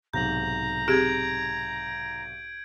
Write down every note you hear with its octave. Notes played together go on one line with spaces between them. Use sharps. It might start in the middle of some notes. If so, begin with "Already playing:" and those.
B1 G#2 C3 A#5 G6 F#7
C4 G4 G#4 G#6 D7